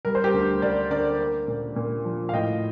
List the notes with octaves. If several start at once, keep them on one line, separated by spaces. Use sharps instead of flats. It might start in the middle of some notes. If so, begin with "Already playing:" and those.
G3 A#4
C5
G4 A#4
D2
A#3 A#4 D5
D3 A#4 D5
A#3
A#2
A#2
F3
F5
A2 D#5 G5